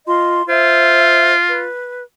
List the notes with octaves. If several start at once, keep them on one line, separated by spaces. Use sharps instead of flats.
F4 D#5 C6
F4 C5 E5
B4